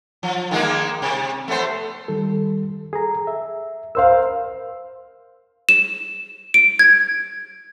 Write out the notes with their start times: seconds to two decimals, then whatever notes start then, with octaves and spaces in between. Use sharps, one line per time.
0.23 F3
0.51 D#3 G#3 A#3
1.02 C3
1.48 A3 B3 C5
2.08 D#3 G3 A4
2.93 G#4 A4 A#5
3.27 E5
3.95 A#4 C5 F5 E6
5.69 E7
6.54 D7
6.79 G#6